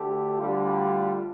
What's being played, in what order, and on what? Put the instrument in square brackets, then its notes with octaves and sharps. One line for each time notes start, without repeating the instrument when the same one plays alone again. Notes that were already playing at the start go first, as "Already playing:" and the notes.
Already playing: [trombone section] D2 D3 A3 D4 G4
[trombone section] D2 D3 G3 [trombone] F4